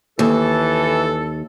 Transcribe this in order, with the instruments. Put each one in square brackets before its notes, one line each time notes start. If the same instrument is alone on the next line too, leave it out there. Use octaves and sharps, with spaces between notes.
[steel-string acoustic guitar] D#2 [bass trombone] E3 [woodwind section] A4